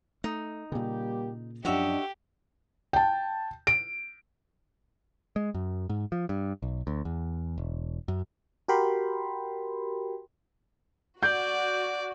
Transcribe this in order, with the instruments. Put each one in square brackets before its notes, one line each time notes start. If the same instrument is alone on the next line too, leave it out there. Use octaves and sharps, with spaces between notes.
[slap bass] A3 [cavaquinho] D#4
[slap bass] A#2 C#3 [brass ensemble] G3 A#3 G4
[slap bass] F#2 F3 [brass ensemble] D4 D#5 [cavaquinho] F#4 C#5 E5 [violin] G4
[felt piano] G5 A5
D7
[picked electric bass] G#3
F#2
G#2
F3
G2
B1
D2
E2
E1
F#2
[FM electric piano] F#4 G4 A#4 G5 B5 C6
[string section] F#4 [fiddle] D5 [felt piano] G6